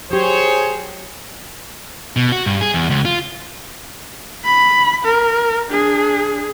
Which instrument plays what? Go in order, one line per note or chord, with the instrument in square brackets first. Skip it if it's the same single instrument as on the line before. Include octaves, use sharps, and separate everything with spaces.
[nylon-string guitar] F#3 G4 [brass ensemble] G#4 C5 C#5
[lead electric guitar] B2
F#4
G2
G#4
E2
C#2
F4
[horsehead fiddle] B5
A#4
D4 G#4